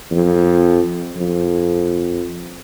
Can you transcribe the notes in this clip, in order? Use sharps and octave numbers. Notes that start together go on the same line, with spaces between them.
F2
F2